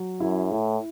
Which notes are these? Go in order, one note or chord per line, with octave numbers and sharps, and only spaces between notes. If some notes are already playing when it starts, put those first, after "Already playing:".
Already playing: F#3
F#2 E4
A2 E4